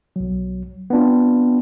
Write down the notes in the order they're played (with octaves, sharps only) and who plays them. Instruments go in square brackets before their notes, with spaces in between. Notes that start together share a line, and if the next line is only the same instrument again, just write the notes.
[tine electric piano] B1 F#3
B3 C4 D4 F4